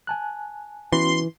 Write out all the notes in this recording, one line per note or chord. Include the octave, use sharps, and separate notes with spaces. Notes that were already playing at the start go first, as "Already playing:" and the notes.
G#5 A5 F#6
E3 B3 C#4 F#4 C6